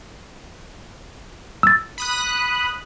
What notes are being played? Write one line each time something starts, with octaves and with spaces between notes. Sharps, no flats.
E6 A6
B5 D#6 F#6